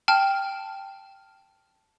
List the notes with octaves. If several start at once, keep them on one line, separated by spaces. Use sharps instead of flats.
G5 A5 F6